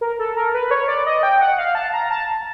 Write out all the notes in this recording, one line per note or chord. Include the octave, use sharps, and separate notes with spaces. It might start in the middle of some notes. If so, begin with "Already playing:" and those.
A#4
A4
A#4
B4
C#5
D5
D#5
G5
F#5
F5
A5
A#5
A5